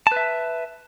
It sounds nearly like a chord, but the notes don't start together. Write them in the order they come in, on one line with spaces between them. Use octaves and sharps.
A5 B4 E5